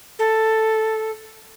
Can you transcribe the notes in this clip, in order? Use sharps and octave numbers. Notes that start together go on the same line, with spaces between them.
A4